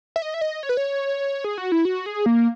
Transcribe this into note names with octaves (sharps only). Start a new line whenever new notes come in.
E5
D#5
E5
D#5
C#5
B4
C#5
G#4
F#4
E4
F#4
G#4
A#3